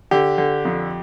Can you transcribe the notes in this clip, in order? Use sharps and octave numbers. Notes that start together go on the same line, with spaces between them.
D3 G4
D3
F2